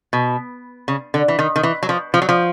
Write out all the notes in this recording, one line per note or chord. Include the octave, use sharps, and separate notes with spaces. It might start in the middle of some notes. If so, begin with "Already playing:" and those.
B2
C#3
D3
E3
D#3
D#3
E3
F#3
F3
F3
F#3
F3